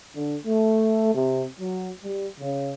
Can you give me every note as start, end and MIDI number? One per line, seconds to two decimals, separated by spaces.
0.15 0.36 50
0.46 1.14 57
1.15 1.43 48
1.60 1.89 54
2.04 2.27 55
2.40 2.73 49